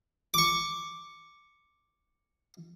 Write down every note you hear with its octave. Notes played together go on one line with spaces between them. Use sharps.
C#6 D6